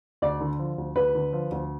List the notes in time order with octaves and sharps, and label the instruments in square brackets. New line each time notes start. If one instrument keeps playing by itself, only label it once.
[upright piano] D2 [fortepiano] D5
[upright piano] D3
F3
D2
[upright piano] D2 [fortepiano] B4
[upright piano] D3
F3
D2